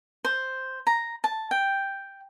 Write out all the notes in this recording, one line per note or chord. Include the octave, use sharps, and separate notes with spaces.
C5
A#5
A5
G5